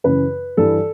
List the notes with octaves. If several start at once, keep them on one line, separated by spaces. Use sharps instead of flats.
F#2 C#3 E3 B4
G2 E3 A4